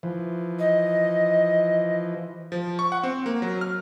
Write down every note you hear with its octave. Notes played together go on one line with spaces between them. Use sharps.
E3 F3
D#5
F3
C#6
F#5
C4
A#3
F#3
F6